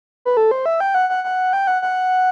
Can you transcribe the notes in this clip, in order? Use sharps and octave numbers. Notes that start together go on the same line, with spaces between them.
B4
A4
C5
E5
G5
F#5
F#5
F#5
G5
F#5
F#5